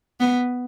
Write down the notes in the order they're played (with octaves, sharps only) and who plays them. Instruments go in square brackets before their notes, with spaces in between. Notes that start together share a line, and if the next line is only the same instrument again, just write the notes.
[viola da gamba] B3